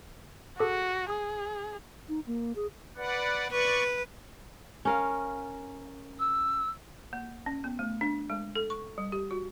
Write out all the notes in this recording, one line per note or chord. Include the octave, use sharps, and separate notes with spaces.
F#4 G#4 A4 D6
G#4 D#6
D#4
A#3
G#4
B4 D5 F#5
B4 D5 C#6
C#4 A#4 F5
E6
A#3
C#4
B3
A3
D4
G#3
A4
C#6
G3
G4
F#4